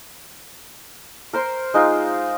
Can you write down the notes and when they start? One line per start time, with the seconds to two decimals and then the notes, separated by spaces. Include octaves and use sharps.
1.33 A#4 C5 C6
1.74 G#3 D#4 F4